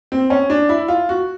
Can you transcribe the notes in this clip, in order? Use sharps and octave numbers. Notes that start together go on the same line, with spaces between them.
C4
C#4
D4
E4
F4
F#4